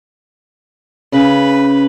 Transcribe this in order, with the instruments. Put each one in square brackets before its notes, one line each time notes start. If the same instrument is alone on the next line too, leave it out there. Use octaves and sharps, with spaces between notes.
[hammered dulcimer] C#3 [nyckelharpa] B4